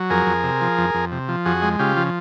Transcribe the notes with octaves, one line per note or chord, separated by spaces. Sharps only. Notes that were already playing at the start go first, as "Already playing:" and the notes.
Already playing: F#3
F2 G#4 A#4
F2
C3
F3
F2
F2
C3
F3
F2 F#4 G#4
G#3
C#3 F4 G4
F3